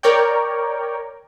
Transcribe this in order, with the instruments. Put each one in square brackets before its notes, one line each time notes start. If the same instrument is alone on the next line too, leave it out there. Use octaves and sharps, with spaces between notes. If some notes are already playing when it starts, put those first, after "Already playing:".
[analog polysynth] A#4 C#5 D5 G5